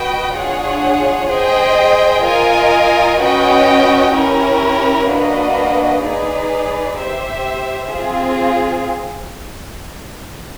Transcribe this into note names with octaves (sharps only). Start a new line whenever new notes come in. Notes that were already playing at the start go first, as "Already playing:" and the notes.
Already playing: F#4 B4 D#5 G5
D4 F4 G#4 C#5 F#5
G#4 C5 D#5 G5
F4 A#4 D#5 G#5
C#4 F#4 B4 D#5 G5
C#4 E4 G4 A#4
A#3 D4 F#4 B4 D#5
D#4 G#4 B4 D5
G4 C5 E5
C4 F4 G#4